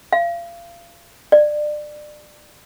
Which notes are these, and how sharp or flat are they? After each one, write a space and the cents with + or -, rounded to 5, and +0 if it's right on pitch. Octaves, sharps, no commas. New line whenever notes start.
F5 -30
D5 +25